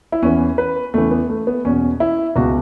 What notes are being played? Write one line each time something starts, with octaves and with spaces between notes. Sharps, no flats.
E4
E2 E3 C#4
B4
E2 C#3 E3 A3
B3
A3
B3
E2 B2 C#4
E4
C#2 B2 F#4